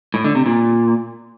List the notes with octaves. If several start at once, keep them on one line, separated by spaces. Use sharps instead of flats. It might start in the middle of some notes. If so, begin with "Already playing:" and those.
A2
D3
C3
A#2